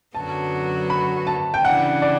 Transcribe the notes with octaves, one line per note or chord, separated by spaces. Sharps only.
F#2 D3 F#3 B3 F#4 A5
B5
A5
G5
C#3 E3 G3 D4 F#5
D5